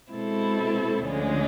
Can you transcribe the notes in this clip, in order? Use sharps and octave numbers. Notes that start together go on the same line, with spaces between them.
B2 G#3 C4 E4 A4
D2 D3 F3 G#3 C#4